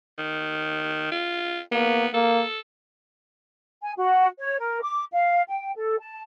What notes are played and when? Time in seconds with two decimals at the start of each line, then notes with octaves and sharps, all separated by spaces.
0.18 D#3
1.12 F4
1.72 A#3 B3
2.14 A#3 A4
3.81 G#5
3.96 F#4
4.38 C#5
4.58 A#4
4.82 D6
5.11 F5
5.49 G5
5.75 A4
5.98 A5